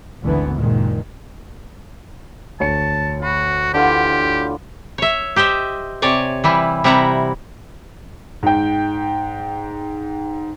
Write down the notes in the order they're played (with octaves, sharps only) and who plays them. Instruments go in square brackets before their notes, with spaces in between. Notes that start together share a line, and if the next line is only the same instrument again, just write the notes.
[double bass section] G#1 D2 D3 E3 B3
F#1 A#2 D#3 G#3
[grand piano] D2 C#5 C#7 [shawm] A5
[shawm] F#4 [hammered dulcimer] B5
[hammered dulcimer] D3 E3 F4 [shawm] G4
[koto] C#5 E5
G4 C5 D#5 E5
C3 C#5 D5 G#5
E3 G3 E4
C3 G3 E4 E5 F#5 A#5
[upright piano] G#2 G5